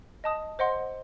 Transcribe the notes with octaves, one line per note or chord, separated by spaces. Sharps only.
D#5 A5 D#6
C5 D#5 F#5 C6